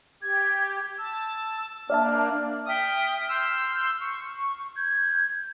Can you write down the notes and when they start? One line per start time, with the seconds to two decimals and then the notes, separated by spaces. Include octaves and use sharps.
0.22 G4 G#6
0.98 A5 E6
1.90 A#3 D4 D5 E5 A5 F6
2.67 E5 G5 D#6 F6
3.29 C6 E6 F6 G6
4.00 C#6
4.76 G6 G#6